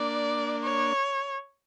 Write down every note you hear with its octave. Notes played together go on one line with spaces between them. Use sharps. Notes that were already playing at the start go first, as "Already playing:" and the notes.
Already playing: A#3 D4 D5
C#5